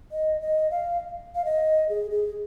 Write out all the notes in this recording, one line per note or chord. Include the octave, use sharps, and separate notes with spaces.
D#5
D#5
F5
F5
D#5
G#4
G#4